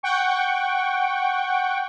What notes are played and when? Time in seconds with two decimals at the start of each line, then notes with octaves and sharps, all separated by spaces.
0.03 F#5 G5 C#6